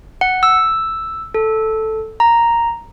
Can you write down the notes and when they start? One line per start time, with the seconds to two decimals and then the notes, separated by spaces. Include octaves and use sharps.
0.21 F#5
0.43 E6
1.34 A4
2.20 A#5